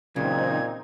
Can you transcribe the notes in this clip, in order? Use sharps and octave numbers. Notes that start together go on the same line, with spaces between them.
A#2 C#3 E3 F#3 C4 D#4 G#6